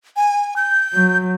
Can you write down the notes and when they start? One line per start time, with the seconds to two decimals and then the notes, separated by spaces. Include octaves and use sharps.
0.17 G#5
0.56 G6
0.93 F#3